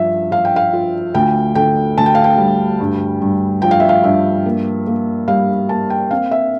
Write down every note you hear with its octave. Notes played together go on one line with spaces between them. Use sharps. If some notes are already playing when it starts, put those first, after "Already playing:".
Already playing: G2 F3 E5
F3 F5
G5
F5
F4
D2 G5
D3 G5
D2 A5
G5
F5
G5
G3
G2
G2
F3 G5
F5
E5
F5
G2 E5
A#3
A#3
G3 F5
A#3 A5
G5
C4 F5
E5